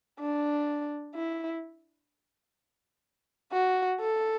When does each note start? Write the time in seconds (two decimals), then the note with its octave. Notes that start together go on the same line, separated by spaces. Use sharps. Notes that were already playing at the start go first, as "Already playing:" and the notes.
0.20 D4
1.15 E4
3.52 F#4
4.00 A4